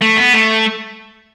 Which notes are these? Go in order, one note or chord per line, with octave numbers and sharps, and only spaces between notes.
A3
B3
A3